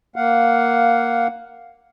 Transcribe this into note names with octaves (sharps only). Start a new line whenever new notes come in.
A#3 F5 F#5